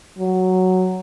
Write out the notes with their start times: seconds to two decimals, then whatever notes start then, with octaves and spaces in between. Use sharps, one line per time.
0.18 F#3